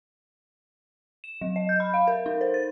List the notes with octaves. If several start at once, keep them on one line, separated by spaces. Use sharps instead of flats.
E7
F#3
D#5
G6
B5
F5
A#4
D#4
C5
A6